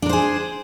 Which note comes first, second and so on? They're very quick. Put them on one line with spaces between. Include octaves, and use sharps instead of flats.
D4 A#4 C5 G#4